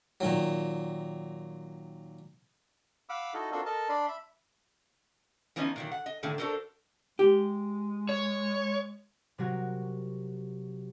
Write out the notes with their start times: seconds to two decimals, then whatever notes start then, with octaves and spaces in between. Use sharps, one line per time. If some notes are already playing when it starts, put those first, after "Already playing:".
0.21 A#2 D#3 F#3
3.09 F5 F#5 B5 D6 E6
3.34 D#4 E4 F#4 A4 D#5
3.52 C4 D4 F4 F#4 A4 A#4
3.66 A4 A#4 D#5 A5
3.89 D4 D5 B5 C6
4.08 E5 B5
5.56 E3 F3 B3 C#4 D#4
5.76 A#2 D#3 F#3
5.91 F#5
6.06 D#5
6.23 A2 D3 D#3 A#3
6.38 D4 F#4 A4 A#4 C5
7.19 G#3 G4
8.09 C#5
9.38 C3 F#3 F#4 A#4